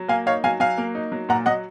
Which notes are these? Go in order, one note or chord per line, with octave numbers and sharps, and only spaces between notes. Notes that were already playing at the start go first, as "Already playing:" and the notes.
Already playing: F#3
A#3 F5 G#5
D#4 C#5 F5
F#3 F5 G#5
F#3 F5 G#5
A#3
D#4
F#3
A#2 F#5 A#5
F#3 D#5 F#5